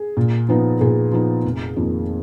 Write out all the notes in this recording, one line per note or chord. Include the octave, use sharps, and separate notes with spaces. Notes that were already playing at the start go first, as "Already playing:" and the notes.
Already playing: G#4
A#2
F3 B3 D#4
A#2 G#4
F3 B3 D#4
F1
F2 D#3 A#3